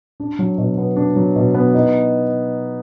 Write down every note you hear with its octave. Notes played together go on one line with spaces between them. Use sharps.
D4
F#3
B2
B3
D4
F#3
B2
B3
D#4